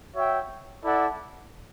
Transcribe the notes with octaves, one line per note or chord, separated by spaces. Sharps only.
F#4 C#5 E5 G5
E4 A4 D5 F#5